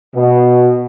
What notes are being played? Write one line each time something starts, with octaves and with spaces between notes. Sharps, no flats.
B2